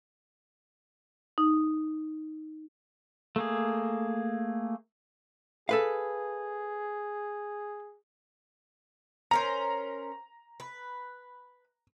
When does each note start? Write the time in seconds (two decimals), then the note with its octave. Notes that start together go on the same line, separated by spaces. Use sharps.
1.38 D#4
3.36 A3 A#3 G#4
5.69 G#4 A4 B4 F5
9.31 C#4 A#4 C5 A#5
10.60 B4